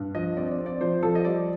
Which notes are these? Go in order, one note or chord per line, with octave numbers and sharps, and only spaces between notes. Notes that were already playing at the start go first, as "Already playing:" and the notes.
Already playing: G2
F3 D#5
C4 D5
D5
C4
D5
F3 C5
F3 A4
D#5
G3 D5